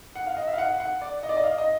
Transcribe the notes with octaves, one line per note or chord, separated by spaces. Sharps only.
F#5
F5
D#5
E5
F5
F#5
F#5
D5
D#5
D5
D#5
F5
D#5